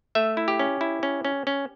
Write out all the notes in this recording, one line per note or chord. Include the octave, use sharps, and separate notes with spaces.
A3 E5
E4
G4
C#4
E4
C#4
C#4
C#4